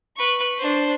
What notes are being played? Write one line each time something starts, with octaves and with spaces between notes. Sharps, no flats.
B4 C#6
D4 C5